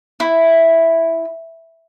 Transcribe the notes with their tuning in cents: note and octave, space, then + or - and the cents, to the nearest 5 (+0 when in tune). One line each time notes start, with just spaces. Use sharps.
E4 +0